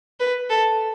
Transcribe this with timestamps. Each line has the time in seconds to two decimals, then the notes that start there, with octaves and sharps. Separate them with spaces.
0.20 B4
0.50 A4